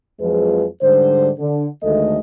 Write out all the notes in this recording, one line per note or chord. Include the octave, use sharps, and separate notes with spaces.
F2 F3 F#3 G#3 G#4 B4
G#2 D3 G3 C5
D3
D2 D#3 G#3 A3 A4 D#5